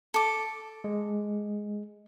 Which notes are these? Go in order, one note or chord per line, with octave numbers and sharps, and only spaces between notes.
A4 D6
G#3